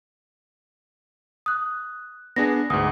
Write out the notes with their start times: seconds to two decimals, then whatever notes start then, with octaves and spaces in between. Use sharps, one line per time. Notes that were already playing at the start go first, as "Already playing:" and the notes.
1.46 D#6 F#6
2.36 B3 D4 G#4 A#6
2.70 D2 G#2 D#6